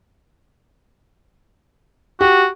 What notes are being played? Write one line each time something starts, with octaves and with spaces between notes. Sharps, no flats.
F#4 G4